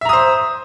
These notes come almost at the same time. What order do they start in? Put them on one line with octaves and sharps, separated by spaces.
E5 A#5 D#6 C5